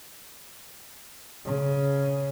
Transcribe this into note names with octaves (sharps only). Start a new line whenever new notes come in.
C#3